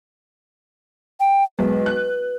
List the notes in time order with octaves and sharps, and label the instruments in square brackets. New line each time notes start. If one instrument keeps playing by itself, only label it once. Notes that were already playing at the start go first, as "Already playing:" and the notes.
[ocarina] G5
[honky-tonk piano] B1 G#3 [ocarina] B4
[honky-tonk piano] F#6